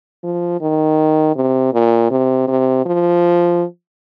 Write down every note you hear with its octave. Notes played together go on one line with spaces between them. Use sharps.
F3
D#3
C3
A#2
C3
C3
F3